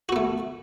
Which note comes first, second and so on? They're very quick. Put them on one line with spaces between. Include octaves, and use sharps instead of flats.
F#4 B3 A3